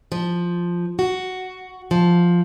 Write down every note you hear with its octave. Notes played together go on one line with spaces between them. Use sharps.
F3
F#4
F3